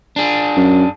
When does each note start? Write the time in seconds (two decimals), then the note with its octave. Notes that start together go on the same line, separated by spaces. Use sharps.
0.16 D4 G#4
0.56 F#2